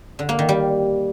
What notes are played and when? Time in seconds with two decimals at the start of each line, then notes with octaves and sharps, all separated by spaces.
0.19 D3
0.29 A#3
0.39 D#3
0.49 G3